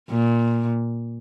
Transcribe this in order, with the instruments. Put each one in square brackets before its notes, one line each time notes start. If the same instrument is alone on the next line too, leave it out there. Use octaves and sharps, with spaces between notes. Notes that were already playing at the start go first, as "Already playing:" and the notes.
[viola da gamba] A#2